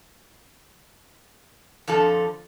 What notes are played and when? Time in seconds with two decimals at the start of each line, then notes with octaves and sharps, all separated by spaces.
1.88 F2 D3 F3 A4 A5